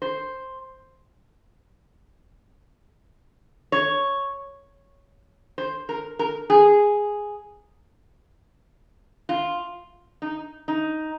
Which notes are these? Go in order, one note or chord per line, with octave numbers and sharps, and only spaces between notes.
C5
C#5
C5
A#4
A#4
G#4
F4
D#4
D#4